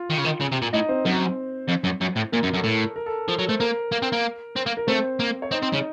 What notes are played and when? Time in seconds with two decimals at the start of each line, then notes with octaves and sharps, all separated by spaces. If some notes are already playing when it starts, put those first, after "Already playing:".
Already playing: F4
0.10 D#3
0.18 C#3
0.25 D#3
0.41 C#3
0.52 C3
0.62 A#2
0.73 A2 D#4 D#5
0.89 C4 C5
1.05 F#2 C4 C5
1.69 F2
1.84 F#2
2.01 F#2
2.16 A2
2.32 A#2 A#4
2.43 F#2
2.53 F#2 A4
2.64 A2 A#4
2.96 A#4
3.06 A4
3.28 F3 A4
3.39 F#3
3.49 A3 C5
3.60 A#3 A#4
3.92 A#3
4.03 C4
4.13 A#3
4.56 C4
4.66 A#3
4.77 A#4
4.87 A3 C4 C5
5.20 A#3
5.42 C#5
5.51 C4 D#4 D#5
5.62 C4
5.73 C#3